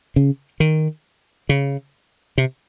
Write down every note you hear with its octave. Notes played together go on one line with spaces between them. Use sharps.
C#3
D#3
C#3
C3